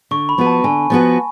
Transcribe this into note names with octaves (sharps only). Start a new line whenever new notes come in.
D3 C#6
B5
F3 B3 F#4 B4
A5
D3 G#5
F3 B3 F#4 B4